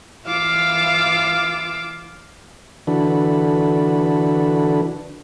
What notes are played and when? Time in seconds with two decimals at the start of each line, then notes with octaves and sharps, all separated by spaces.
0.25 E3 F4 F5 D6 E6
2.87 D3 E3 D4 F#4 A4 B4